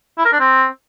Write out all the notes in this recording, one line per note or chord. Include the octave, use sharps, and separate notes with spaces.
E4
A#4
D4
C4